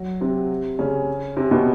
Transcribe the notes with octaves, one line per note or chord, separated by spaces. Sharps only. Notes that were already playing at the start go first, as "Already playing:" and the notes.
Already playing: F#3 F#4
C3 C4
C#3 C#4
C3 C4
B2 B3